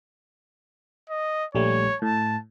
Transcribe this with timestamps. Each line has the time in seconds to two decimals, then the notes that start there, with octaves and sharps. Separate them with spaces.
1.10 D#5
1.55 A#1 G3 A3 C#5
2.02 A2 A5